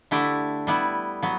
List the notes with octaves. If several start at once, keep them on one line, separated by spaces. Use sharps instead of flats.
D3 A3 E4 G4
G3 B3 E4
F#3 B3